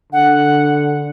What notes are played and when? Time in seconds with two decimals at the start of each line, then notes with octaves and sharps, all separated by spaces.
0.13 D3 F#5